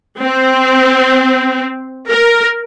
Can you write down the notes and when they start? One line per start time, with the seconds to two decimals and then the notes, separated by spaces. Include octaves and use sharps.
0.20 C4
2.09 A#4